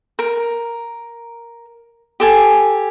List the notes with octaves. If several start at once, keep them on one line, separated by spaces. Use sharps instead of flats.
A#4
G4 A4 G#5